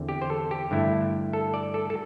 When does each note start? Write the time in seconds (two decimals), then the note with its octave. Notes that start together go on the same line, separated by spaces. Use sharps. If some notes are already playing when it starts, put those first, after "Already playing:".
Already playing: E2 D3 C4
0.09 G4
0.22 C5
0.30 A4
0.51 G4
0.71 G2 D3 A3 E4
1.33 A4
1.54 D5
1.74 A4
1.90 A4